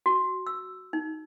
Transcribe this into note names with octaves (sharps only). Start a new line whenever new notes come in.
F#4
E6
D#4